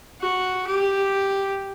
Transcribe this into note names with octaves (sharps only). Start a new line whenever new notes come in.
F#4
G4